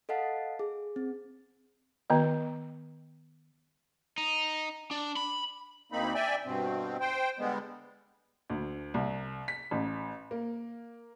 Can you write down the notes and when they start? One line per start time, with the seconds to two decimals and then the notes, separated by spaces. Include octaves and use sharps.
0.09 A4 D#5 F5 F#5 A5
0.59 G#4
0.96 C4
2.10 D#3 B3 D#5
4.18 D#4
4.91 D4
5.17 B5
5.92 D2 A#3 C4 D#4 B5
6.14 D5 E5 G5 G#5
6.45 G2 B2 C4
7.01 C5 G5
7.39 D3 G3 G#3 B3
8.50 D2
8.94 C2
9.48 B6
9.71 A1
10.31 A#3